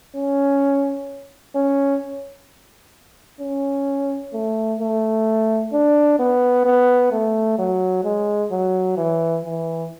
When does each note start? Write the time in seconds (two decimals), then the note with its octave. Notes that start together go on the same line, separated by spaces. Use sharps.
0.16 C#4
1.55 C#4
3.40 C#4
4.33 A3
4.80 A3
5.73 D4
6.19 B3
6.66 B3
7.12 A3
7.58 F#3
8.04 G#3
8.51 F#3
8.97 E3
9.45 E3